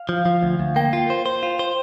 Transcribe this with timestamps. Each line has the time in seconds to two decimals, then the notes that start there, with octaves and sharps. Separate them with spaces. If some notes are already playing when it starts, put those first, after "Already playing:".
Already playing: F5
0.09 F3
0.25 F3
0.43 D2
0.60 D2
0.76 A#3 G5
0.93 F4
1.10 C5
1.26 C5
1.43 F4
1.59 C5